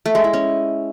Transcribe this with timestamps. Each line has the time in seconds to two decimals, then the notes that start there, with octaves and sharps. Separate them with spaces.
0.06 A3
0.15 G#3
0.24 E4
0.33 C#4